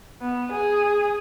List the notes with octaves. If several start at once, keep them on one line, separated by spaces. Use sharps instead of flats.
B3
G#4